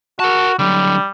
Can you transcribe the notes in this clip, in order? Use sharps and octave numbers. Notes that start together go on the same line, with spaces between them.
F#4 A#4 A5
D3 F#3 G3